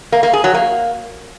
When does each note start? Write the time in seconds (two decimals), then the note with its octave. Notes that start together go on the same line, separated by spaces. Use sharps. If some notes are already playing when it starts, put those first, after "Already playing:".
0.12 A#3
0.23 A#3
0.33 G#4
0.44 F#3
0.54 A#3